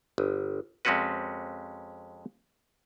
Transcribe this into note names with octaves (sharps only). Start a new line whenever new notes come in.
G1
F2 G#3 C4 C#4 F#4 B4